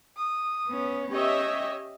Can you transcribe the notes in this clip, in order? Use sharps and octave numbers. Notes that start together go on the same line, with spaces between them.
D#6
B3 C#4
C#4 G4 C#5 D#5 E5